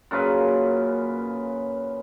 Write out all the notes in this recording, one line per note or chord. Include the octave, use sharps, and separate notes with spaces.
F#2 A#2 C#3 B4